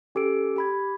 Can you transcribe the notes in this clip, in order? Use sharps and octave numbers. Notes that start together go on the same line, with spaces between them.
C#4 G4 A4 D7
G4 B5 G#6